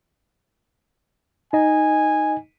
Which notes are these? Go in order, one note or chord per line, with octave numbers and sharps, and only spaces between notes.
D#4 D#5 G#5